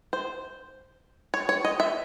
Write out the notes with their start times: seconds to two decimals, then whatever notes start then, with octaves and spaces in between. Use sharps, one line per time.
0.13 C5
1.34 C#5
1.49 C#5
1.65 D#5
1.80 E5